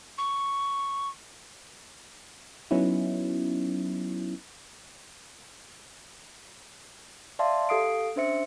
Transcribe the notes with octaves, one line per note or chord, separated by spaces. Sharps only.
C#6
F#3 B3 C#4 D#4 E4
D5 E5 F5 A5 C6
G4 A4 F5 D#6 C7 D7
C#4 D4 C5 E5 C#7